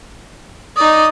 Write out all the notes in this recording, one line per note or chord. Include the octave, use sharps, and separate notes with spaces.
D#4 D5 D#6